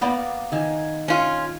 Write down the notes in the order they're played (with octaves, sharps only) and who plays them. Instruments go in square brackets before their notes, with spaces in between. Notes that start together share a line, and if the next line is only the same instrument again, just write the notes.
[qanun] A#3 B3 D5
D#3 G#5
[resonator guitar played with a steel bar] C#4 F4 [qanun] G#5